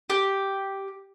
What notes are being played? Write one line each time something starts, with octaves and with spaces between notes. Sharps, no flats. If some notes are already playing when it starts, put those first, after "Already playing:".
G4